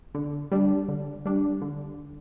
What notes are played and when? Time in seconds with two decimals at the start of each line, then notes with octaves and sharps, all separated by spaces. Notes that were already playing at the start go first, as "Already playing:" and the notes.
0.15 D3
0.52 G3 D4
0.88 D3
1.25 G3 D4
1.62 D3